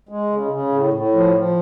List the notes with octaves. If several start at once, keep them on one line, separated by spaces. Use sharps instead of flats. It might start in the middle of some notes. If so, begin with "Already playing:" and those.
G#3
C#3
C#3
A2
A2
F3
F3